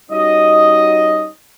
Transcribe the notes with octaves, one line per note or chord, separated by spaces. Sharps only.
G3 C#4 D#4 F#4 D#5